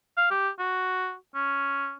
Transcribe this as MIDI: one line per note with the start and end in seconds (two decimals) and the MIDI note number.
0.17 0.26 77
0.31 0.49 67
0.60 1.15 66
1.35 1.95 61